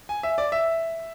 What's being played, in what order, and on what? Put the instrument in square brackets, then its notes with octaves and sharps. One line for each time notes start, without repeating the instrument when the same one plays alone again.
[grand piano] G#5
E5
D5
E5